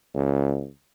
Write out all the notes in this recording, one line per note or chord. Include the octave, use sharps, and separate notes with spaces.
C#2